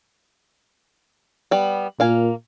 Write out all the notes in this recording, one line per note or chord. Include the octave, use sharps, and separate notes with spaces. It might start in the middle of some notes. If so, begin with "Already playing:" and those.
G3 B3
A#2 A#3 F5 G#5